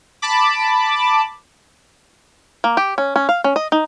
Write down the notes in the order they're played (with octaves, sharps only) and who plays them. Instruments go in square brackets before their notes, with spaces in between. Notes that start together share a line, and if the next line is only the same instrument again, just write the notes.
[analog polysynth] A5 B5 D6
[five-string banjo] A#3
G4
C#4
C#4
F5
C#4
D#5
D#4